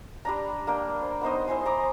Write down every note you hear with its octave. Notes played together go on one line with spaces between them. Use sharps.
G3 D4 A#5
A#3 D4 G5
C5
B3 D#4 C5 D#5
E4 C5 G#5 C6
D#5 A#5 D6 D#6